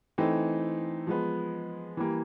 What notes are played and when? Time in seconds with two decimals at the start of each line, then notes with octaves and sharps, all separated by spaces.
0.18 E3 A3 C4 D#4
1.07 F3 G#3 B3
1.97 E3 G3 A#3